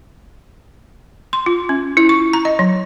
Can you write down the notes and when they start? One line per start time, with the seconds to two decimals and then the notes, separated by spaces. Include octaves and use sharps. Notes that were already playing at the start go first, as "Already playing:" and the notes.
1.33 C6
1.46 F4
1.69 C#4
1.97 E4
2.09 C#6
2.33 A#5
2.45 D#5
2.59 F#3